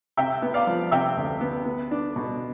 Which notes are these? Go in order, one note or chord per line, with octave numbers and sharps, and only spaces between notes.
C3 E5 G5
B3
D5 F5
F3
C3 E5 G5
D2
B3
B3
D4
B2